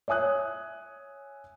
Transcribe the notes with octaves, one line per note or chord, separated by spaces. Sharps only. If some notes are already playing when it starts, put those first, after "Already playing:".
C#5 E5 G#5 D#6 F#6